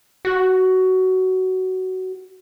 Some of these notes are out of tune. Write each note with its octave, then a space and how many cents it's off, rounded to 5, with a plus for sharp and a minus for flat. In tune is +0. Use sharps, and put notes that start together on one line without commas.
F#4 +15